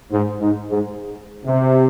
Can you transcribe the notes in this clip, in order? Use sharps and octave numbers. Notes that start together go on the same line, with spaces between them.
G#2
G#2
G#2
C3